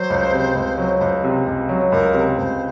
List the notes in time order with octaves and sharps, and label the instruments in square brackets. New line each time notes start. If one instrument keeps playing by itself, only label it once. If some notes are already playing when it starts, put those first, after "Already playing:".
Already playing: [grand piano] F#3 [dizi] C5
[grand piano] C#2
C3
C#2
F#3
C#2
C3
C#2
F#3
[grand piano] C#2 [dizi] A#4
[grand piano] C3
[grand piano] C#2 [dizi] C5